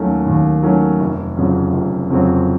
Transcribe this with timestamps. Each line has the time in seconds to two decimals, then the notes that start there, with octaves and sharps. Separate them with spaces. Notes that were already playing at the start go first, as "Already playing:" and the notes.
Already playing: D#2 D#3 F#3 A3 C#4
0.26 D#2
0.62 D#3 F#3 A3 C#4
1.00 F1
1.37 F2 C#3 F#3 C4
1.73 F1
2.10 F2 C#3 F#3 C4